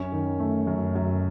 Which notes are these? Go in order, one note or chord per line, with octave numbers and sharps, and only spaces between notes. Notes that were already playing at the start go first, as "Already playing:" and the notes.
Already playing: F#2 C#4
D#3
A3
F#2
F#2